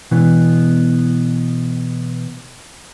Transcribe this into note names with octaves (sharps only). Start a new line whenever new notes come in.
B2 E3 B3